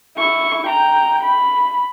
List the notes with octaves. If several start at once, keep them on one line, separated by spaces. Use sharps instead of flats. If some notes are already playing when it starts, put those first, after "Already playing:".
E4 C#6
G5 A#5
B5